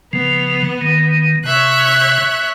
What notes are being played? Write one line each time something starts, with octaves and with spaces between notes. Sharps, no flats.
C#3 F3 B3
D#3
C3 C#5 E5 F#6